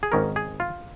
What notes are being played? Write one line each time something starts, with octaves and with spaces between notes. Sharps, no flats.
G#4
G#1 G#2 D#3 C#4 A#4
G#4
F4